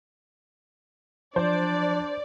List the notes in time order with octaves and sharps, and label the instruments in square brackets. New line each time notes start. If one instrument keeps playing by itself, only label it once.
[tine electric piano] F3 [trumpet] D4 [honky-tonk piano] C5 [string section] D5